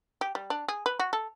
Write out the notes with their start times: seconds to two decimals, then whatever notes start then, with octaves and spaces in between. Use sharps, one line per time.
0.21 G4
0.35 G3
0.50 D4
0.68 G#4
0.86 B4
0.99 F#4
1.13 A4